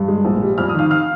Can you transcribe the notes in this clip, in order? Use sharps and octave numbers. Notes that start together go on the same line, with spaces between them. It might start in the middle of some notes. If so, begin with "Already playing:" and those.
Already playing: G2
G#3
A#1
G3
F2 F6
D#6
D#3 F5 F6
F5 F6